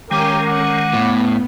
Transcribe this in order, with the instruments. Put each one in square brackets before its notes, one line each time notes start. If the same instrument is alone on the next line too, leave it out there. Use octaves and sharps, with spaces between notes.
[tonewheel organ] D#3 G#3 [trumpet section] A#3 G4 [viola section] C#4 A#4
[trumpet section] F#5 D6
[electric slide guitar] A2 [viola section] B3